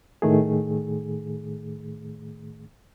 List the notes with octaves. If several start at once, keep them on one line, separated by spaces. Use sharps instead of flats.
A2 D#3 A3 G#4